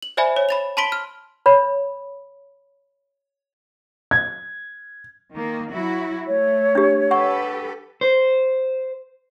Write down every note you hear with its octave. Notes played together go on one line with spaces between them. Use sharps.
F#7
C5 D5 E5 G#5 B5
C#5
B5 A6 F7
A5 B5 C6 B6 D7 G7
F6
C#5 B5
G#6
D#3 A#3
F#3 E4 F#4
A3 C#5
D4 G4
G4 A4 B4 F#5 C#6
C5